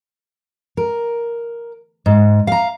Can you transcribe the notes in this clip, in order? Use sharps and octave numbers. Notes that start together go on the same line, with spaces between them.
A#4
G#2
F5 A#5